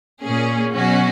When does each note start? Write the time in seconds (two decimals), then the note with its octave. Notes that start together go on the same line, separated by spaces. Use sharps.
0.23 A#2 A#3 C#4 G#4
0.74 B2 F#3 C#4 F#4